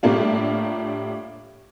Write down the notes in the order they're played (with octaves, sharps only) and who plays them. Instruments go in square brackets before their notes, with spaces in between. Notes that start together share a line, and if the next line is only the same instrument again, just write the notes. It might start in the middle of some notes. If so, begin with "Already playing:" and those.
[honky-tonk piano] A2 G3 A3 A#3 D4 F4